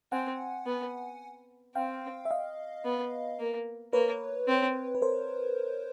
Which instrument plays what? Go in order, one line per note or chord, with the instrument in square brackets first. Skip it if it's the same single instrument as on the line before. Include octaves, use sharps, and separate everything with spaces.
[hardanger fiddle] C4 [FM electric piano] F#5 G#5
[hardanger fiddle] B3
[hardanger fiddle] C4 [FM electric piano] F5 G5
[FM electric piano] E5
D#5 F5
[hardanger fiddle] B3
A#3
[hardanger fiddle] A#3 [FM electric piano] B4 C#5
[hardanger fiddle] C4
[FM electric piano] B4
A#4 C5